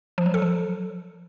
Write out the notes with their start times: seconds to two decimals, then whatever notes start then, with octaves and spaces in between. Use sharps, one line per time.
0.18 F3
0.26 F#3
0.34 A4
0.42 F3